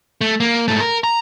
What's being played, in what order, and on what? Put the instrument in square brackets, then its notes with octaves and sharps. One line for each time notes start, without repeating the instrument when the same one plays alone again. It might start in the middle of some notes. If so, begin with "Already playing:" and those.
[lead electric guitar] A3
A#3
G#2 A3
A#4
A#5